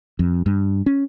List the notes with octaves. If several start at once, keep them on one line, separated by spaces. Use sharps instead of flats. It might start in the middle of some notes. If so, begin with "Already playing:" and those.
F2
G2
C#4